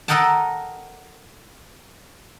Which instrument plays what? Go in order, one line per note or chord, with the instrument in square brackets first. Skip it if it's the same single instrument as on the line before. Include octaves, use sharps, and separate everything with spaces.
[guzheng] A4 A#4 D#5 F#5 G5 A5